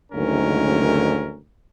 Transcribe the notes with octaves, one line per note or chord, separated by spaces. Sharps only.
F#1 D2 G#2 D#3 C#4 A#4